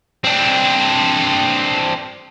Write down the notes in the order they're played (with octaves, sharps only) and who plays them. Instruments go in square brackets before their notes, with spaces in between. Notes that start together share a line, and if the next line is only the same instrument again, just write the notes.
[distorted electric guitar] C4 D4